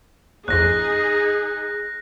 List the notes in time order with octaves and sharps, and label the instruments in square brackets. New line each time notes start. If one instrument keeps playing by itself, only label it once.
[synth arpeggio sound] A#1 F2 [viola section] D#4 G#4 [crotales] F#6 A#6